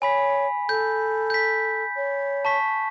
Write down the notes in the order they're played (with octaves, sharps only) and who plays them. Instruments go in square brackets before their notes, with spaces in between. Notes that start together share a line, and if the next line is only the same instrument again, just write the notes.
[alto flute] C#5 [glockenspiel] G#5 B5 B6
[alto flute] A4 [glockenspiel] G6
[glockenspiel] G6 B6
[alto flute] C#5
[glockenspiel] A5 C#6 B6